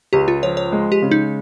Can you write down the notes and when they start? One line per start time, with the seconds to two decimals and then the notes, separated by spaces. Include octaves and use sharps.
0.13 C#2 G4
0.28 F4
0.43 F3 C#5
0.57 C#5
0.72 G#3
0.92 G4
1.02 C#3
1.11 D#4